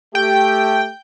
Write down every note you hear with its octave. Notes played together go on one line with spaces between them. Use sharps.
A3 G4 G5